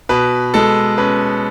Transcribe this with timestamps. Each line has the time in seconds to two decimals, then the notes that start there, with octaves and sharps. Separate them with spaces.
0.09 B2 B4
0.54 G#3 A4
0.98 C#4 B4